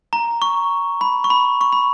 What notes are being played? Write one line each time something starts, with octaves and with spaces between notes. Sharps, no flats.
A#5
C#6
B5
C#6
B5
C#6
B5